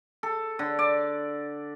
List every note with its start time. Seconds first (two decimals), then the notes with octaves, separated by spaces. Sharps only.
0.23 A4
0.59 D3
0.79 D5